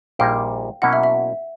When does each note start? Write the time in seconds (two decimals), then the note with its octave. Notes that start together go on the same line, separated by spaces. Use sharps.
0.19 A#1 A#2 G3 A#3 D#4 F5 G5
0.82 B2 F#3 A#3 C#4 E4 F#5
0.93 E5
1.03 E5